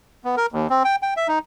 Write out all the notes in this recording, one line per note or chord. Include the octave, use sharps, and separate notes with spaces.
B3
A#4
D#2
C4
G5
G5
E5
D#4